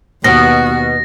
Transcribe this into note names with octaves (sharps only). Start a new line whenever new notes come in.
D#2 B2 F#4 A#6